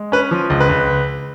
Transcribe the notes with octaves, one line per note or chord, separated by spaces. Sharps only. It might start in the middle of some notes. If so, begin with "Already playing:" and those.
Already playing: G#3
C#4 B4
F3
C#2
B4
C#2